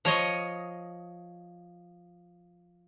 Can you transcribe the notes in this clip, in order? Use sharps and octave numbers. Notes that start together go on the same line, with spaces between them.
F3 C#5 D#5